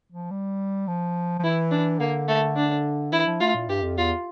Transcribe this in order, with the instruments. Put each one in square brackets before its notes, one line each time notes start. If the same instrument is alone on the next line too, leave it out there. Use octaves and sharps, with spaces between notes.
[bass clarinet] F3
G3
F3
F3
[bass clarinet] E3 [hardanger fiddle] E4
[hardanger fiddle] D4
[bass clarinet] D3 [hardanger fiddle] A#3
[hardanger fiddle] A3
D4
[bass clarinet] E3 [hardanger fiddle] E4
[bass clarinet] F3
[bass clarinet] A3 [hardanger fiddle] F4
[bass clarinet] A#2
[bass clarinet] G2 [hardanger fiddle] G4
[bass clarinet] F2
[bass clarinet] E2 [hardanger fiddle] F4